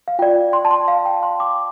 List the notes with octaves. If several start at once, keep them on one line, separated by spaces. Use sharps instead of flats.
F5
F4 D5 G5
C6
A5
C6
F5
G5
C6
D6